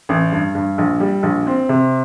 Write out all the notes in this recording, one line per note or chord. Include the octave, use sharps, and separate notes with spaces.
A1
G2
G2
A#1
G3
A#1
C4
C3